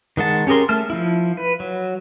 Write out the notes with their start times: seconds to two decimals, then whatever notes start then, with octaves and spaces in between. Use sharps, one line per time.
0.17 D#3 G#3 F#5 A5
0.47 C#4 G4 G#4 A#4 C6
0.69 A3 A5 F6
0.90 F3 E4
1.37 B4
1.60 F#3